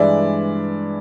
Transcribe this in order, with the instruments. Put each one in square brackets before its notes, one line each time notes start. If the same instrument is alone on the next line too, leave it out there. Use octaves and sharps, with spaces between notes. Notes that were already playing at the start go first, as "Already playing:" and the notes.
Already playing: [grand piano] G2 E3 G#3 D5 E5